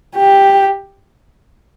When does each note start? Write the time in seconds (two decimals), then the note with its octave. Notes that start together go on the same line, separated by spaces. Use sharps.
0.16 G4